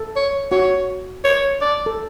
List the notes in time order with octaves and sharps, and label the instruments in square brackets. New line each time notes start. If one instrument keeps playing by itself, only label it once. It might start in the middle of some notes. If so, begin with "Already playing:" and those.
Already playing: [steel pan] A4
[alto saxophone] C#5
[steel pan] F#4 [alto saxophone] C#5
[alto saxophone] C#5
D5
[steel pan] A4